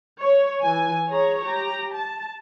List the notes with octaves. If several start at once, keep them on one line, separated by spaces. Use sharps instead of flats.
C#5
E3 G#5
G#4 C#5 A#5
G4 A#5
A5